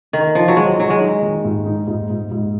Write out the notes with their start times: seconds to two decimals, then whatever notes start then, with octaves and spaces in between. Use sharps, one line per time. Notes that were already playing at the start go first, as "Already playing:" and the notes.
0.13 D#3 D#4
0.35 F3 D#4
0.48 F#3
0.57 D#3 G#3
0.78 D#3 F#3
0.90 G#3
1.01 D#4
1.22 D#3
1.44 G#2
1.66 D#4
1.87 G#2
2.10 G#2
2.31 G#2